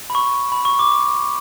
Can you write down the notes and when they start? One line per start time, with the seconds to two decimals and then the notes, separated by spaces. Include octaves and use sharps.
0.10 B5
0.15 C#6
0.52 B5
0.65 C#6
0.79 D6